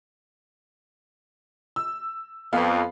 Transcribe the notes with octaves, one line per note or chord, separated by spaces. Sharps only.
E6
F2 B3 F5